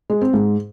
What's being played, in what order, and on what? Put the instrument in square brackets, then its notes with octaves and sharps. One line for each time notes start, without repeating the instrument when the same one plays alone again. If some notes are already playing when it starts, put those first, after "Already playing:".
[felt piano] G#3
C4
G#2